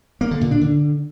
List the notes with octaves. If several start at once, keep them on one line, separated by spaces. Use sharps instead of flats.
A#3
D3
A#2
D4
D3